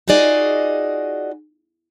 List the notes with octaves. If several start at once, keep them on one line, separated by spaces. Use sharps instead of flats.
D#4 F4 F#4 G#4 D5 D#5